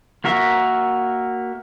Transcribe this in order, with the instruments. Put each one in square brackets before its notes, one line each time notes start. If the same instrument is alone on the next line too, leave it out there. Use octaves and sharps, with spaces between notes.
[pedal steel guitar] A#3 F#4 A#4 E5